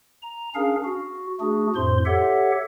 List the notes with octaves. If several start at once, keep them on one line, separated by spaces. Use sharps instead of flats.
A#5
C#4 D4 G#4 A#4 F5
F#4
A3 D4 F#4 G#4
F2 A2 C5 C6
G4 A4 C#5 E5 F#5